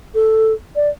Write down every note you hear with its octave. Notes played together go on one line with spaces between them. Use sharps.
A4
D5